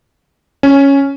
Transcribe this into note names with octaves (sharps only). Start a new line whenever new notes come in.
C#4